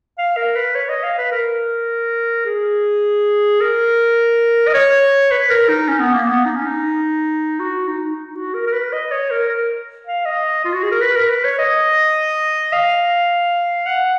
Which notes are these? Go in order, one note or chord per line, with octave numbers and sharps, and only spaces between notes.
F5
A#4
B4
C#5
D#5
F5
B4
A#4
G#4
A#4
D#5
C#5
B4
A#4
D#4
C#4
B3
A#3
B3
D#4
C#4
D#4
F#4
D#4
D#4
F#4
A#4
A#4
B4
D#5
C#5
A#4
A#4
F5
D#5
F4
F#4
G#4
A#4
B4
A#4
B4
C#5
D#5
F5
F#5